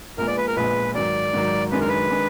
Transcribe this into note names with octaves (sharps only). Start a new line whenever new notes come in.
A#1 A#2 G#3 B3 A#4
D5
B4
A#4
A#1 A#2 G#3 B3 B4
G#2 D#3 F#3 D5
G#2 D#3 F#3
F#1 F#2 D#3 G#3 D4 B4
A#4
B4
D#3 G#3 D4